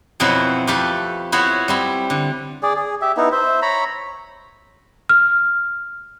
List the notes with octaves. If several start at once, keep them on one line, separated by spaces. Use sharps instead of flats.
F2 B2 F#3 C4 E4 B4
F2 A3 G4 B4 E5 A5
B3 E4 F#4 C5 C#5
G3 C4 E4
D3
G#4 D5
G#4
G4 E5
B3 D#4 E4
C5 E5
C#5 A#5 B5
F6